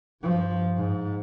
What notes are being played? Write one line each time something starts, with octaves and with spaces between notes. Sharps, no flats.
G2 F3
G#2